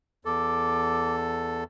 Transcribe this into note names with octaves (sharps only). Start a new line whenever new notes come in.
E2 A4 D6